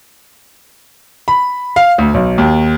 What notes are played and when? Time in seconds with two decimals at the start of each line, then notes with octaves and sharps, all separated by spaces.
1.28 B5
1.76 F5
1.98 D2
2.14 B1
2.38 D#2